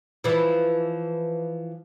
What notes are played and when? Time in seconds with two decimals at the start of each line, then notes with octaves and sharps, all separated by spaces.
0.24 E3 F3